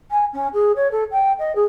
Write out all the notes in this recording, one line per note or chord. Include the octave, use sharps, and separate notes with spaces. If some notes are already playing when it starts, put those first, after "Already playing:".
G#5
C#4
G#4
C#5
A4
G5
D#5
G#4